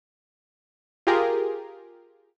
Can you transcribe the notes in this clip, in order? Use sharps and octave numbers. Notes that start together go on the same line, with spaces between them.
F4 G4 G#4 A#4